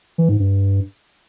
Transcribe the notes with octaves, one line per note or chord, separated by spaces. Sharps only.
E3
G#2
G2